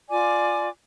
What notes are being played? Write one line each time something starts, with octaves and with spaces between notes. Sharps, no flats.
F4 D5 G#5 D6